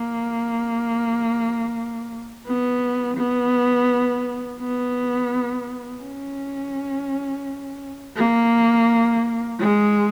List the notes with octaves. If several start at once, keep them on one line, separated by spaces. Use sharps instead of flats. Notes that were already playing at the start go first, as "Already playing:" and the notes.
Already playing: A#3
B3
B3
B3
C#4
A#3
G#3